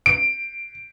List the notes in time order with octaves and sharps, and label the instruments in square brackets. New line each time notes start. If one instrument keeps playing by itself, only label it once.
[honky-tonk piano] D7